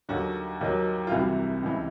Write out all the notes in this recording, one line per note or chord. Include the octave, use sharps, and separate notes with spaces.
D#2 D3 F#3 F#4
D#2 D#3 F#3
F4
C2 C3 E3 F#4
C#2 C3 E3